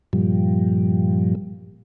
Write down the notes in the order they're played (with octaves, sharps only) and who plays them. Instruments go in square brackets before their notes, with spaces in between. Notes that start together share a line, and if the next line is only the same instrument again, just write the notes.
[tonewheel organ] G2 A#2 F3 G3